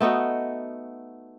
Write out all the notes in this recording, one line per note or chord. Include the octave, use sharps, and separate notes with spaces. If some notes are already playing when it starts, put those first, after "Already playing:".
A3 B3 D#4 F#4